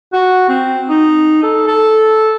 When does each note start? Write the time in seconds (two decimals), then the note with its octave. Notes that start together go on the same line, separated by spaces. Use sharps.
0.13 F#4
0.49 C4
0.89 D#4
1.43 A4
1.68 A4